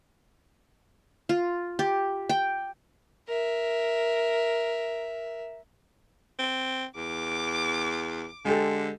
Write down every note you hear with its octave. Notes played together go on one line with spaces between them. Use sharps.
F4
G4
G5
A#4 E5
C4
E2 D6
D3 G#3 G4 A4